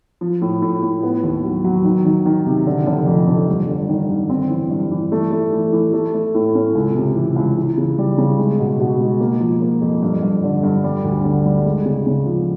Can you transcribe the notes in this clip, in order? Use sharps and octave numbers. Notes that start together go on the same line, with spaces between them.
F3
A2
A2
A2
B3
D#2
F#3
F#3
D#3
D#3
D#3
C3
D3
F1
F2
F1
G2
G1
D#3
G1
C4
E3
G2
E3
A3
A3
E3
E3
A3
A3
A2
C#4
C#2
C3
E3
C#2
E3
C#3
G3
C#3
G#3
B2
B2
G#3
A#3
F3
A#3
F2
G2
G2
D3
G2
G3
D2
D3
G3
G#3
C#3
C#3
F3